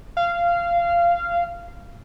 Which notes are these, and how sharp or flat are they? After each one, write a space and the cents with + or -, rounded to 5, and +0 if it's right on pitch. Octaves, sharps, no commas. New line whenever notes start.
F5 -15